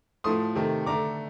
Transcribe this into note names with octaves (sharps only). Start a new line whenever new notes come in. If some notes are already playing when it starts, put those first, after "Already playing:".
A2 F3 A3 C6 D#6
C3 D#3 A3
D3 A3 A#5 D6